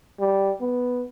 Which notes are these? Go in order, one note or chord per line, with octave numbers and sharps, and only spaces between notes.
G3
B3